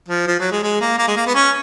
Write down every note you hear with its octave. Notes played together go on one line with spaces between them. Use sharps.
F3
F3
F#3
G#3
G#3
A#3
A#3
G#3
A#3
B3
C#4